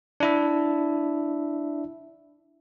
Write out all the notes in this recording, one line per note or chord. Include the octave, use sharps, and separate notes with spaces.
D4 E4 E5